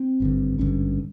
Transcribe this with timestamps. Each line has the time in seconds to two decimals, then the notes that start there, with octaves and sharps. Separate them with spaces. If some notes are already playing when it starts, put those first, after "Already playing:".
Already playing: C4
0.20 G#1 G2 D3
0.58 G#1 G2 D3 C#4